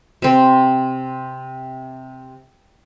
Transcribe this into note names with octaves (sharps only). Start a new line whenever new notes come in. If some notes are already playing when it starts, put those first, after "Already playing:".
C3 C4